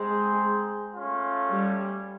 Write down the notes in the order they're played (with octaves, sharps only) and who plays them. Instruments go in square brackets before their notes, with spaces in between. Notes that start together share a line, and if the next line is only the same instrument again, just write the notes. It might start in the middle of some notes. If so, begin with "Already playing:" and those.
Already playing: [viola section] G#3 [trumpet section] C4 D#4 G#4 C5
[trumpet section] A3 C#4 F4
[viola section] G3